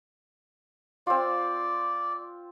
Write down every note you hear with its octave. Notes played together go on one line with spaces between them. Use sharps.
C4 F4 D5